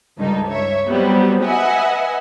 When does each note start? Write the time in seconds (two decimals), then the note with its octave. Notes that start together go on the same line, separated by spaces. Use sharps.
0.18 C#2 G2 D#4 A4
0.49 C#5 E5
0.89 F#3 G3 B3 C4
1.45 B4 D#5 E5 F#5 G#5